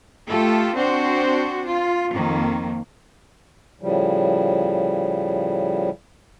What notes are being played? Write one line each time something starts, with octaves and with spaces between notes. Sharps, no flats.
A3 F4 G4 A4
C4 D4 F#4 C5
F4
F2 D#3 A#3
A2 C#3 F3 G3